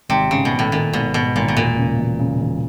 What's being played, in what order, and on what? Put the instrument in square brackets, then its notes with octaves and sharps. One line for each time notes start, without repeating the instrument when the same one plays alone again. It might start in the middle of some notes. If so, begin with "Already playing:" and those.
[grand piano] G#1 [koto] C3
[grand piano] G#2 [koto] C#3
[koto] B2
[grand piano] G#1
[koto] A2
[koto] A#2 [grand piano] D#3
[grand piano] G#1 [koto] B2
[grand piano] G#2 [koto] B2
[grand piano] G#1 [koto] A#2
[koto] B2
[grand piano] E1 [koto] A#2
[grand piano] C#3
E1
C#3
E1